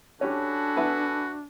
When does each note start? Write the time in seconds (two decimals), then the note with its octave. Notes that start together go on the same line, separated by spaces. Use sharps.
0.21 C#4 D4 F#4 G4 A4 G#5 B5
0.76 B3 B4 E5